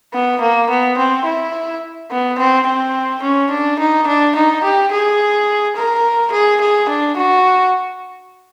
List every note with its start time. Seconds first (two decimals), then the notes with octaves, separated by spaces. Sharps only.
0.13 B3
0.41 A#3
0.70 B3
0.98 C4
1.25 E4
2.11 B3
2.38 C4
2.66 C4
3.22 C#4
3.51 D4
3.79 D#4
4.07 D4
4.36 D#4
4.64 G4
4.91 G#4
5.76 A#4
6.32 G#4
6.61 G#4
6.89 D4
7.17 F#4